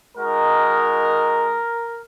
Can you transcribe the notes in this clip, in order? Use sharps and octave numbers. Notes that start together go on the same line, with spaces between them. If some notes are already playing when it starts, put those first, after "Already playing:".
G#3 D#4 F#4 A#4